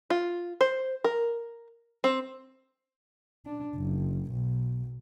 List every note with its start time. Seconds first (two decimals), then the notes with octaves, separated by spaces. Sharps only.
0.10 F4
0.61 C5
1.04 A#4
2.04 C4
3.46 D4
3.76 F#1
4.31 B1